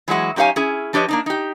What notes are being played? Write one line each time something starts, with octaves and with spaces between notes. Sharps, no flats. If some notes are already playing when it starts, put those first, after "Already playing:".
E3 F#3 G#3 F#4
F#2 D#4 G4 C#5 F5 G#5
C#4 E4 G#4
F3 D4 G4 B4 C#5 D#5
A#3 D4 D#4
D#4 G4